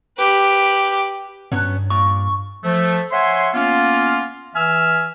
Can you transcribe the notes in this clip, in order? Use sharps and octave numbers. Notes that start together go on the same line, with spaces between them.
G4 B4
G2 F#3 B3 C#4
A#2 C#6
F3 A3
C#5 E5 F#5 G#5 C6
A#3 B3 C#4 F4
E3 E5 G#5 E6 F6